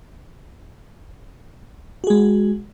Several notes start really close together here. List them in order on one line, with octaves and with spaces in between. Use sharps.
F#4 G#4 G#3